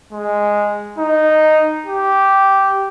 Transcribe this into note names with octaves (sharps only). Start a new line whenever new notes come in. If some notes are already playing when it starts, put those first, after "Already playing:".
G#3
D#4
G4